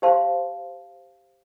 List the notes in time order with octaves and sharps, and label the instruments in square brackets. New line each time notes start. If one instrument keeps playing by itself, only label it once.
[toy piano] G4 C5 F5 A5 C6